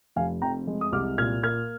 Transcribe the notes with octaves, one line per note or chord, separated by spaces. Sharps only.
F1 F5 G#5
F2 G5 A#5
G#3
D#6
C2 D6 F6
A#2 F6 G#6
A#3 F6 G#6